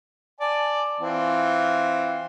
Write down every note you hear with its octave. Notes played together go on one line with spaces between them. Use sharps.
D5 G#5 A5
E3 C4 F4